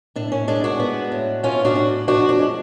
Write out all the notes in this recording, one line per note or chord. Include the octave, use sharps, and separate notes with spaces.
A2 D4
C#4
G#3 D4
D4 F#4
B3
A2
A2 C#4 F4
D4 F#4
A2
F3 D4 F#4
D4
G#3